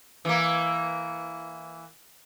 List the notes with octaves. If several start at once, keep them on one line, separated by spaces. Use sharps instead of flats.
E3 A#3